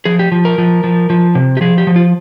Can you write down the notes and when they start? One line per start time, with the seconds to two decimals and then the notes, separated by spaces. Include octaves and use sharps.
0.05 F3 G#4
0.19 G4
0.32 F3
0.45 A#4
0.58 F3
0.84 F3
1.10 F3
1.35 C3
1.57 G4
1.61 F3 G#4
1.78 G4
1.87 F3
1.96 F4